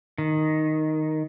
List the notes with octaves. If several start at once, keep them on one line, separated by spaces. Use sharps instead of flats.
D#3